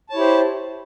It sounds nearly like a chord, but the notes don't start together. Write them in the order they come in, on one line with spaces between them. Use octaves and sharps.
A5 C#5 E4 G4 C5